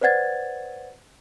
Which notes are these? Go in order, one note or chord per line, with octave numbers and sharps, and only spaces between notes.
B4 C5 D5 F#5 G#6 A6